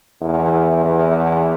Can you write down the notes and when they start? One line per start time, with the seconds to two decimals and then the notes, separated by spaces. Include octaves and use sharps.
0.21 E2
0.85 E2